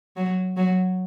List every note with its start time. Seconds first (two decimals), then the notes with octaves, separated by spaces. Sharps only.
0.17 F#3
0.57 F#3